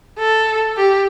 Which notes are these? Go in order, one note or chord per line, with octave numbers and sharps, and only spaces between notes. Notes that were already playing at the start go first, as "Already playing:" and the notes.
A4
G4